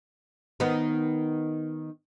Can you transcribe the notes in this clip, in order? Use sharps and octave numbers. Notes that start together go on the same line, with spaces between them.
D#3 B3